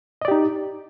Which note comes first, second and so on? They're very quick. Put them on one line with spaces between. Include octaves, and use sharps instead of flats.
D#5 D5 G4 D#4